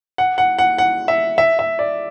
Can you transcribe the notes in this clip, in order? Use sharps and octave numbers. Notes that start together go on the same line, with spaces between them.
F#5
F#5
F#5
F#5
E5
E5
E5
D5